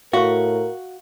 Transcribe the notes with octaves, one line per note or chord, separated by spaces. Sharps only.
A2 F#4 A#4 F5 C#6